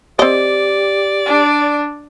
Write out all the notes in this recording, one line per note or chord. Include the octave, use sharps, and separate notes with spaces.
C4 G4 D5 D#5
D4